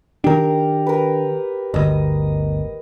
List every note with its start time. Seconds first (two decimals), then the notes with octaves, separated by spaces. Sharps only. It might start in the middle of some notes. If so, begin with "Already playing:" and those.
0.24 D#3 D4 G4 A#4
0.87 A#4 B4
1.74 G1 D2 D#5